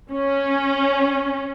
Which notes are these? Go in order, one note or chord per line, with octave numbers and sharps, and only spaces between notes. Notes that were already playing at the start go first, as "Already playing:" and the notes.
C#4